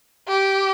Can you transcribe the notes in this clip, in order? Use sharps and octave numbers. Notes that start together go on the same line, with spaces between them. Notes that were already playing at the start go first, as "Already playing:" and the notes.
G4